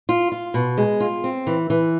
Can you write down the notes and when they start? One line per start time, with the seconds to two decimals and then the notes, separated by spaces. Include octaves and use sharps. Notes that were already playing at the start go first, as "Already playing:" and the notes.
0.09 F4
0.32 F4
0.54 B2
0.78 G#3
1.00 F4
1.24 C4
1.47 E3
1.70 E3